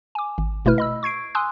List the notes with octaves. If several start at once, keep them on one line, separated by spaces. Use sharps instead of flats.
G#5 D6
G#1
G1 B2 A3 E4 B4 F6
D#5 B5 E6
C#6 G#6 C7 D7
G#5 C6 D#6 E6 F#6